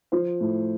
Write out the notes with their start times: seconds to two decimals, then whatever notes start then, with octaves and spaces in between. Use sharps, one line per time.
0.12 F3 C5
0.40 A2